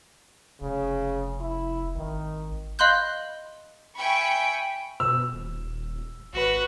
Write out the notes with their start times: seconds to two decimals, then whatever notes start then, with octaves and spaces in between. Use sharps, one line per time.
0.61 F1 C#3
1.40 E4
1.96 G#1 D#3
2.79 D#5 F5 B5 C6 F#6 G6
3.97 E5 G5 G#5 B5 C#6
5.00 B2 E6
5.33 D#1
6.33 G#1 F#4 B4